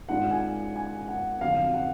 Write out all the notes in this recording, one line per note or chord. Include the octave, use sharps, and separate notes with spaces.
G#1 G#2 G#3 D4 F4 F#5
G#5
G#5
F#5
F2 D3 F#3 F5
F#5